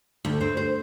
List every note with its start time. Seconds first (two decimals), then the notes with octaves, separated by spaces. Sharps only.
0.25 D2
0.41 C4
0.57 C5